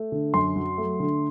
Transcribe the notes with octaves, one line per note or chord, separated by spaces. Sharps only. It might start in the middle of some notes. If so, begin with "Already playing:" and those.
Already playing: A3
D3
F#2 C6
F#3
A3
D3